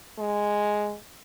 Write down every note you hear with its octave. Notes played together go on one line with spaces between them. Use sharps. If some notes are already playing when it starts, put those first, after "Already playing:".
G#3